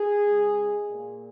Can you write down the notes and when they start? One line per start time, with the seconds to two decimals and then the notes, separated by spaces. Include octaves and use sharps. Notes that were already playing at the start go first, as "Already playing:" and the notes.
Already playing: G#4
0.27 C#3 G#3
0.88 A#2 A#3